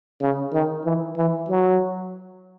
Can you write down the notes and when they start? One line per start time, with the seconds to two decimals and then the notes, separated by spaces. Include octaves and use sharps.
0.21 C#3
0.53 D#3
0.85 E3
1.17 E3
1.49 F#3